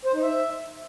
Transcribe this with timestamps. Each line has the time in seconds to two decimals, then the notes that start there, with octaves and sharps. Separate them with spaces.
0.05 C5
0.14 D#4
0.22 E5